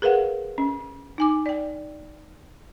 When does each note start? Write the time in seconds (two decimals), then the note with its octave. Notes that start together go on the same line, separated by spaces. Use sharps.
0.02 G#4 A#4 B4 F5 F#5
0.58 C#4
1.18 D#4 G#5 D6
1.46 D5 G5